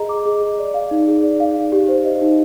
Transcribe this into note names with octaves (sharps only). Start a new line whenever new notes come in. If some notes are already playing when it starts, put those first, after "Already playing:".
Already playing: G#4 D#5 A#5
D6
G#4
G#4
D5
F5
D#4
G#4
D5
F5
D#4
G4
C5
D#5
D#4